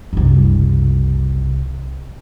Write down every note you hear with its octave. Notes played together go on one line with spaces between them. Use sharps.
F#1 C2